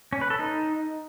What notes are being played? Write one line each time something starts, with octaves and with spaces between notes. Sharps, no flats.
C#4
B4
A4
D#4